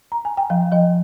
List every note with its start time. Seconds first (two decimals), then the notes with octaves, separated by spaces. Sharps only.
0.12 A#5
0.25 G#5
0.37 G5
0.50 F3 F5
0.72 F3 D#5